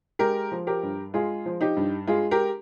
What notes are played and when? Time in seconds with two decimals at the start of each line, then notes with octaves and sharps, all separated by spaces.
0.19 G#3 G4 A#4
0.52 F3
0.67 G4 A#4
0.83 G2
1.14 G#3 F4 G#4
1.46 F3
1.61 D#4 G4
1.77 G2
2.07 G#3 F4 G#4
2.31 G4 A#4